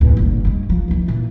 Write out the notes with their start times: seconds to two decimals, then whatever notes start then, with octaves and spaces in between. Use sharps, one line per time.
0.01 E2 A2
0.17 G1 A#2
0.45 G2 G#3
0.70 F3
0.88 D#2 E3
1.08 A#2 E3